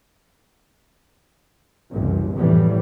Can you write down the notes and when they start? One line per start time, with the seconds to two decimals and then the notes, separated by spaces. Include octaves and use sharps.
1.91 F#1 C2 G2 E3
2.34 F1 E2 A2 E3 G3